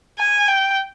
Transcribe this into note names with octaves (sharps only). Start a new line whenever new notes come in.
G#5
G5